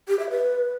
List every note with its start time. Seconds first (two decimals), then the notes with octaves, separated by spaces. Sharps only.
0.08 G4
0.19 E5
0.30 B4